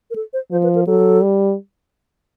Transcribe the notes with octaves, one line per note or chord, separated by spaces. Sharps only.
A#4
A4
C5
F3 C5
B4
A#4
F#3 A4
G3